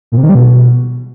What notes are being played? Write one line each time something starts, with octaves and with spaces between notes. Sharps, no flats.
A#2
C3
D#3
G3
B2